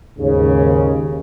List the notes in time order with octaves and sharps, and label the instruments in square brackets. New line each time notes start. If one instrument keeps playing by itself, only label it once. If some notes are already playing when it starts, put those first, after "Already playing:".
[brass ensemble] D#2 G#2 C#3